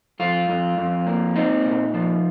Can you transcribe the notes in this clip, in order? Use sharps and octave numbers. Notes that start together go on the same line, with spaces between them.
F2 F4
F2
F2
A#3
C4 D#4
A#2
F3